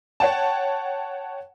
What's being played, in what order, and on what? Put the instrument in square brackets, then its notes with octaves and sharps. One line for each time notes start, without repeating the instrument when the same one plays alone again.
[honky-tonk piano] C#5 F#5 G5 A5